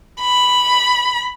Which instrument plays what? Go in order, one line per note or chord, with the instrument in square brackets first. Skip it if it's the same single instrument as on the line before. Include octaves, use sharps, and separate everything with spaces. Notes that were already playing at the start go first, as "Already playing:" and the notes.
[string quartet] B5